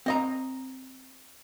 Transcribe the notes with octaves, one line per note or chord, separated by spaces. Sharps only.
C4 D#5 A#5